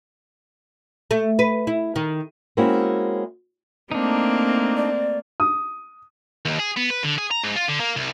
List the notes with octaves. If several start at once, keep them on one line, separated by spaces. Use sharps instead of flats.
A3
B4
E4
D#3
G#3 A#3 C4 C#4 E4 F#4
A3 A#3 C4 D4 D#4
D5
D#6
D#2
G#4
B3
B4
D3
G#4
A#5
G#2
F4
D3
A#3
C2